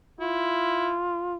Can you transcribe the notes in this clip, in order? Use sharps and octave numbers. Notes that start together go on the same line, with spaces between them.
E4 F4